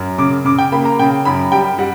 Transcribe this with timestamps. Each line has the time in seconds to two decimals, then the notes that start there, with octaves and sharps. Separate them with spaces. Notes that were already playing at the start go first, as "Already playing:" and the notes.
Already playing: F#2
0.18 C#3 D6
0.45 C#3 D6
0.58 G5
0.72 A#3 B5
0.85 A#5
0.99 C#3 G5
1.25 F#2 B5
1.52 G3 G5
1.78 G3 F#5